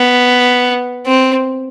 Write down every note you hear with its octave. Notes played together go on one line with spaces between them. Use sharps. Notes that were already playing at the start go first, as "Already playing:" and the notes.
Already playing: B3
C4